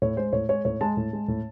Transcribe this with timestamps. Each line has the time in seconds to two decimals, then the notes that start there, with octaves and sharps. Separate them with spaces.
0.02 A2 C#5
0.17 G#3 C5
0.33 A2 C#5
0.49 G#3 C#5
0.65 A2 C#5
0.81 G#3 A5
0.97 A2
1.13 G#3
1.28 A2